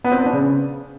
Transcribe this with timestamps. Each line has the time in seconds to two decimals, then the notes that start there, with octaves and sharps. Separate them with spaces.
0.04 B3
0.12 C4
0.19 B3
0.26 D4
0.33 C#3